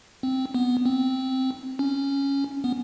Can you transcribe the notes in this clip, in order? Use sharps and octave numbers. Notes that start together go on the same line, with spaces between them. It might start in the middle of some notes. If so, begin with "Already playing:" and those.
C4
B3
C4
C#4
B3